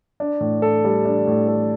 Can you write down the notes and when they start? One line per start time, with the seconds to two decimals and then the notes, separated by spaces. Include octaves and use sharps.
0.20 D4
0.40 A2
0.62 A4
0.84 G3
1.05 D4
1.27 A2
1.48 A4